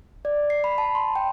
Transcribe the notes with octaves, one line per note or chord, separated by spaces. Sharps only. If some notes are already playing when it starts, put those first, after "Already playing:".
D5
C7
B5
A5
C6
G5